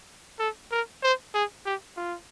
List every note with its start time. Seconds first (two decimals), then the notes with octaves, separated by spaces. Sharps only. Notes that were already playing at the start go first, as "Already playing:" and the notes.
0.39 A4
0.71 A#4
1.03 C5
1.34 G#4
1.65 G4
1.97 F4